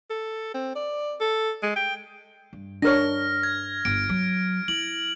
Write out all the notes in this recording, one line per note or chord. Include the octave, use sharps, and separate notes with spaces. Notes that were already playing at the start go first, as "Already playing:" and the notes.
A4
C4
D5
A4
G#3
G5
G2
D4 A#4 C#5 F6 A#6
G#6
G1 D7
F#3
E4 F#7